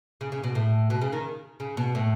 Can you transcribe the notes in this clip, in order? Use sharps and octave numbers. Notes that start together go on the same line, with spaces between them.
C#3
C#3
B2
A2
B2
C#3
D#3
C#3
B2
A2